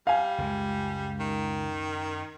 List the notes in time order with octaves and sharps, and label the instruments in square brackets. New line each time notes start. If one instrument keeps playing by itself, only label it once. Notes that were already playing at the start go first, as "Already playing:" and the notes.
[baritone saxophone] G3 [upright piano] F5 G#5
[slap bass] C#2 G#3 [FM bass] F#2
[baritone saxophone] D#3